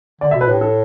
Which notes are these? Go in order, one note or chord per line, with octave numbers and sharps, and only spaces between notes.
D3 D5
E5
B2
B4
A2 G4
A4